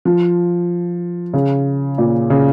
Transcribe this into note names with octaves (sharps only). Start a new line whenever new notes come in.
F3
C#3
A#2
C#3